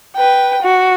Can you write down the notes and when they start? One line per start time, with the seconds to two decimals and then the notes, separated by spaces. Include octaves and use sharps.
0.16 B4 G5
0.62 F#4